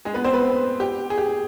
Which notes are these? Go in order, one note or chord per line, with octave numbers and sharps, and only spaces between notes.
G#3 G#4
B3 B4
C4 C5
B3 B4
G4
G#4
G4